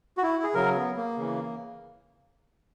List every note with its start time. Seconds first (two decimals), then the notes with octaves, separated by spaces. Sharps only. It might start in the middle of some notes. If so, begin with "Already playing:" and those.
0.17 F#4
0.23 E4
0.43 G#4
0.54 C#3 F#3 A#4
0.76 B3
0.96 A#3
1.18 C#3 E3